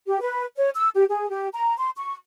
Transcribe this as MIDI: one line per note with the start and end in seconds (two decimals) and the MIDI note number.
0.07 0.19 67
0.21 0.44 71
0.57 0.70 73
0.75 0.89 88
0.95 1.05 67
1.10 1.29 68
1.30 1.48 67
1.54 1.77 82
1.78 1.90 84
1.97 2.15 85